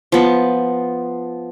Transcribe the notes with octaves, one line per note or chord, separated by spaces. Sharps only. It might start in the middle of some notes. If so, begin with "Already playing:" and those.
F3 B3